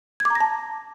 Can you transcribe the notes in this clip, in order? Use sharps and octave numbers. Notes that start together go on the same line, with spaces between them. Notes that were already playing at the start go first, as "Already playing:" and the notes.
G#6
D6
A#5
A#6
A5